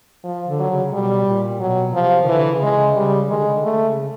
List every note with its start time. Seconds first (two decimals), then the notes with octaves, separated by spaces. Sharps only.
0.24 F3
0.47 D3
0.59 F#3
0.70 C#3
0.92 B2 G3
1.26 A#2
1.60 B2 F#3
1.94 C3 F3
2.24 D#3
2.28 D3 E3
2.51 C#3
2.63 G#3
2.74 C#3
2.96 C#3 G3
3.30 D#3 G#3
3.38 D3
3.47 C#3
3.54 D3
3.64 A3
3.87 C#3